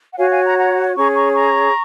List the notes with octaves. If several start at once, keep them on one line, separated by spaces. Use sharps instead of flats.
F#5
F#4 C#5 F5 G#5
F5 G#5
F#5 A#5
F#5 A#5
C#4 G#4 C#5 A#5 C#6
A#5 C#6
A#5 C#6